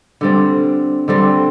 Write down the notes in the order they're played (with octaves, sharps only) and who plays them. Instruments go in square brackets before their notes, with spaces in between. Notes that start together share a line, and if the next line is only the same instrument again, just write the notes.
[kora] D3 G3 C4
D3 G3 C4